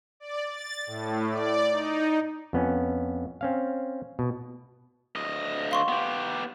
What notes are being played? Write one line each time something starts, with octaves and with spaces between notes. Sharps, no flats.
D5
A6
A2
D5
D#4
F2 B3 C#4
C4 C#4 F5
B2
D2 D#5
F5 C6 C#6
B3 G4